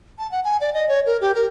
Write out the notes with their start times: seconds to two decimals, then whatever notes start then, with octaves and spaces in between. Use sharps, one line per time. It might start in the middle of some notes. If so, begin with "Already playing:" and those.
0.19 A5
0.31 F#5
0.44 G#5
0.61 D5
0.74 D#5
0.88 C#5
1.06 A#4
1.21 G4
1.35 A#4